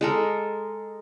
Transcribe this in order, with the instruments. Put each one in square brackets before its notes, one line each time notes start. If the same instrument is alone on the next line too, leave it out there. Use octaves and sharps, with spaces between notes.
[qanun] G#3 A4 A#4